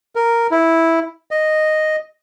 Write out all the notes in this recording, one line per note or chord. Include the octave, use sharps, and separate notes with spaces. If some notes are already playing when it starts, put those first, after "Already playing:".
A#4
E4
D#5